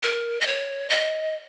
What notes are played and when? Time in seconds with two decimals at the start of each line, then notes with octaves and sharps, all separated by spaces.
0.03 A#4
0.41 D#5
0.47 C#5
0.90 D#5